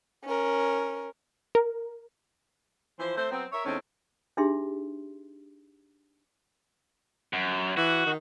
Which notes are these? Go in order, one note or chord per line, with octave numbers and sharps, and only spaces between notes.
C#4 A#4
A#4
E3 F3 C5
A3 C4 C5
F#3 B3 C4
A#4 C#5 E5
E2 A3 C4 C#4 D#4
D4 D#4 G4 G#4 E5 C6
F#2
E3 F#4
D#3